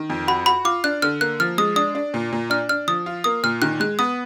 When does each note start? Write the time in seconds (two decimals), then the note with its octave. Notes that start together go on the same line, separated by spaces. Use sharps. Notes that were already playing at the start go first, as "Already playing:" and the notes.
Already playing: D#3
0.10 F2
0.28 F#4 B5
0.46 F#4 B5
0.65 F4 D6
0.84 D4 F#6
1.02 D3 F6
1.21 A#3 F#6
1.40 F3 F6
1.58 G#3 D#6
1.76 D4 D#6
1.95 D4
2.14 A#2
2.32 A#2
2.50 D4 F6
2.69 D4 F6
2.88 F3 D#6
3.06 F4
3.24 A#3 D#6
3.44 A#2 F6
3.62 D#3 F#6
3.80 G#3 F#6
3.99 B3 D#6